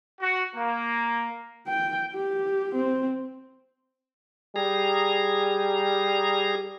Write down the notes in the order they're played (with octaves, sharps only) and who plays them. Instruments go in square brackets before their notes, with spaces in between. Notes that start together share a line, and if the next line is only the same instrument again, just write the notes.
[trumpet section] F#4
A#3
[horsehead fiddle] G5
G4
C4
[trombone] G3 [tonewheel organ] G#4 A#5